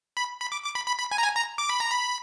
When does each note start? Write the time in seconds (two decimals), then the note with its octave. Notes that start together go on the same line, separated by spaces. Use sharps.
0.17 B5
0.41 B5
0.52 D6
0.64 D6
0.75 B5
0.87 B5
0.99 B5
1.11 G#5
1.18 A#5
1.23 G#5
1.35 A#5
1.58 D6
1.69 B5
1.80 A#5
1.91 B5